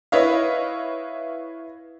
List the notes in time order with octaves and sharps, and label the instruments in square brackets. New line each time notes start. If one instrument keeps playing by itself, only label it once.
[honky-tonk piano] E4 B4 C#5 D#5 F5